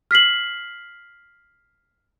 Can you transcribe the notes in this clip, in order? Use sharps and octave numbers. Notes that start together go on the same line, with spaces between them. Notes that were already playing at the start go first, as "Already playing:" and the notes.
F6 B6 C7 F#7